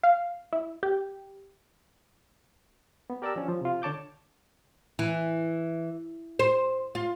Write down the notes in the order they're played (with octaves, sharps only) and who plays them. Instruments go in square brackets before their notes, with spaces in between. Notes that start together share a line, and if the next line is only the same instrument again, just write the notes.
[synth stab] F5
E4
G4
[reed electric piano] B3
G4 A#4 D5 A5 D6 E6
F3 C#4 D4
F3
C3 F4
D3 C#5 A5 D6 G6
[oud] E3
C5
F4